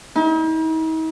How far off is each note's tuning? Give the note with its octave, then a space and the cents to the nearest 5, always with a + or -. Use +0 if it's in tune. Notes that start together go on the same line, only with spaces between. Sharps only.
D#4 +45